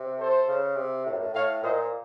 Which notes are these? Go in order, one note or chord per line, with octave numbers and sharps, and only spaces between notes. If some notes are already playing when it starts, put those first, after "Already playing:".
Already playing: C3
A4 C5
C#3
C3
A2
F#2
A2
A2 C#5 F5
A#2 C5 D#5